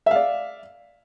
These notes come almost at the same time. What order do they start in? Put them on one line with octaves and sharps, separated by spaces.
E5 F5 D5